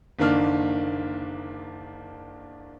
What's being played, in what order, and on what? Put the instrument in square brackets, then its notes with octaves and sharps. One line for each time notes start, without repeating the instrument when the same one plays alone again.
[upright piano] F#1 D3 D#3 A#3 D4 F6